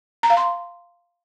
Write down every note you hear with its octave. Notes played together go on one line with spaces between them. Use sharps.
A#5
F5
C6